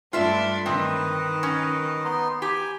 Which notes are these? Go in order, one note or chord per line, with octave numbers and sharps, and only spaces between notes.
G2 A3 D4 F4 E5 B5
D#3 C4 B4 D#5
C#4
B3 D#4 C6
G4 G#5